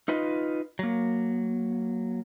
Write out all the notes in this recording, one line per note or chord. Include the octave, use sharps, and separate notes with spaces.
D#4 F4 B4 D#5
F#3 A#3